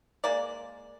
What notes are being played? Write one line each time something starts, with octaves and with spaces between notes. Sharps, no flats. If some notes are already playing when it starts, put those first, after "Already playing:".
G#3 A#3 D5